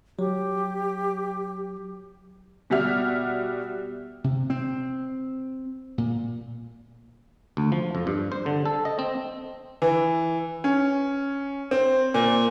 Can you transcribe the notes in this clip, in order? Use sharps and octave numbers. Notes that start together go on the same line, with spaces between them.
F#3 G4
B2 G3 F#4 E5 F6
C3
C4
A#2
D2
F3
F2
G2
C5
D3
A4
D#5
C4
E3
C#4
C4
A#2